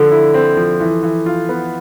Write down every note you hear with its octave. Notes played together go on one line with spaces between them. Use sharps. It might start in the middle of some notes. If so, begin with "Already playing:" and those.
Already playing: D3 F3 A4
E4
C4
F3
E3
E3
F4
B3